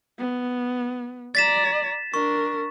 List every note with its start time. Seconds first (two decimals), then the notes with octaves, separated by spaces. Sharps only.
0.19 B3
1.35 D5 A#5 A6 B6 E7
2.14 D4 A#4 C#6